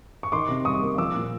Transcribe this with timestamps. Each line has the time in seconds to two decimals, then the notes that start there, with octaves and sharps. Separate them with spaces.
0.23 C#6
0.32 D#3 C6 D6
0.48 C3
0.65 G3 C#6 D#6
0.82 A#3
0.98 F3 D6 E6
1.15 A#2